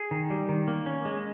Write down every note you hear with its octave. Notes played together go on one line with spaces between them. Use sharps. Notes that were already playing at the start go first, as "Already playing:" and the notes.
Already playing: G#4
D#3
G3
D#3
A#3
C#4
G#3